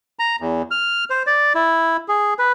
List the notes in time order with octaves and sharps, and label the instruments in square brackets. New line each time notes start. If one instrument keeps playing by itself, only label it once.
[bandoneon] A#5
E2
F6
C5
D5
E4
G#4
B4